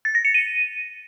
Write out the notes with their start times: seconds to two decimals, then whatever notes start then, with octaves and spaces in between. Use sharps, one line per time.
0.05 A6
0.15 A#6
0.25 C#7
0.34 D#7